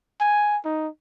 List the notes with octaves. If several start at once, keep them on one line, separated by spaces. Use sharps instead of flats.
G#5
D#4